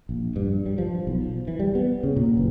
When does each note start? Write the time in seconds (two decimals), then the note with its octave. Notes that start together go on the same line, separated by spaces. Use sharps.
0.09 A#1
0.36 G2
0.66 G3
0.78 F3
1.07 B1
1.21 F3
1.48 E3
1.60 G3
1.75 B3
2.03 C#3
2.17 A#2
2.37 F#1